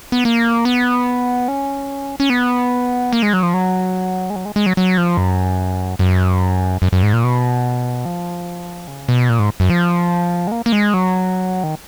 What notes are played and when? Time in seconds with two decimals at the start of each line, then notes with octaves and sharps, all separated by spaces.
0.12 B3
0.25 A#3
0.65 B3
1.48 C#4
2.20 C#4
2.30 B3
3.13 A#3
3.23 G#3
3.33 F#3
3.43 F3
3.54 F#3
4.30 G#3
4.36 F#3
4.45 G#3
4.56 G#3
4.66 F#3
4.77 F#3
4.98 F3
5.17 F#2
5.99 F#2
6.82 F#2
6.92 F#2
7.03 G#2
7.13 A#2
7.24 B2
8.05 F3
8.88 C#3
9.09 B2
9.29 A#2
9.39 G#2
9.60 F#2
9.70 F3
10.47 G#3
10.52 A#3
10.66 A#3
10.72 G#3
10.94 F#3
11.64 D#3